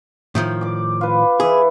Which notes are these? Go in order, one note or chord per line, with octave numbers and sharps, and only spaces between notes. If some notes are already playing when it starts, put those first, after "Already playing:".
A2 D#3 F3
D5 D6
F4 B4
E3 E4 G#4